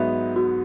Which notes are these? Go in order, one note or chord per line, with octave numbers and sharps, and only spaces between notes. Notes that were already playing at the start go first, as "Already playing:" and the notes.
Already playing: G#2 F#3 B3 D#4 E5
F#4